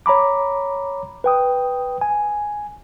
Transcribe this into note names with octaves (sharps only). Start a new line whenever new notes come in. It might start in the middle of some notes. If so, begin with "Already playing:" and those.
C#5 A#5 B5 D6
B4 G5 D#6
G#5